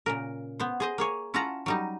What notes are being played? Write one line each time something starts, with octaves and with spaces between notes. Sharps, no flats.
A#2 C#3 A#4
B3 C5
G#4 C5 D#5
A#3 G#4 C#5
C#4 E4 F4 F#5 A5 A#5
F#3 G3 D#4